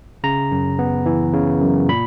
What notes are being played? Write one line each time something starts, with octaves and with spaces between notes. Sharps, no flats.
C#3 A#5
F#2
B3
E3
C#3
F#2
A#2 B5